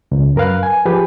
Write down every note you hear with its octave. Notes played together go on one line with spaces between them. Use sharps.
C#2
F#2 A#4 B4 F5 F#6
G#5
F3 G4 G#4 B4